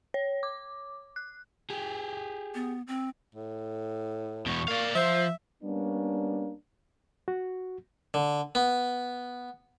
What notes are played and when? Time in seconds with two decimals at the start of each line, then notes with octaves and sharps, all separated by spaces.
0.14 C#5
0.43 D6
1.16 F#6
1.70 G4 G#4
2.55 B3
2.87 C4
3.35 A2
4.46 E2 B2 C#6
4.68 A#3 D5 F5
4.95 F3 C5 E5
5.63 G3 A#3 B3 C#4 D4
7.28 F#4
8.14 D3
8.55 B3